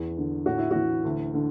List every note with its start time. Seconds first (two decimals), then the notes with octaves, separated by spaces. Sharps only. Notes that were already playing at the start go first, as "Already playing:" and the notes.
Already playing: E2 E3
0.17 D3
0.46 A2 F#4
0.58 E4
0.71 E3 F#4
1.05 D2
1.34 D3